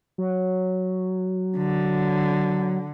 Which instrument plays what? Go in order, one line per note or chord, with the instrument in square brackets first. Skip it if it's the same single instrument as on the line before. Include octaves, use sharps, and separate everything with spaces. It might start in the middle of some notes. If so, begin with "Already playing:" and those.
[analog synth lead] F#3
[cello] D3